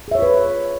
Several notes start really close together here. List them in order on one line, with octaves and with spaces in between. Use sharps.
G#4 E5 C#5 F4 B4